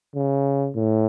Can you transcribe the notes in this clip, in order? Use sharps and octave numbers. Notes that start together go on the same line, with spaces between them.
C#3
A2